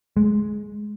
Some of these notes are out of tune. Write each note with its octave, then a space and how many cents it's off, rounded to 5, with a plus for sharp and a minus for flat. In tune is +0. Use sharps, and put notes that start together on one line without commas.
G#3 +15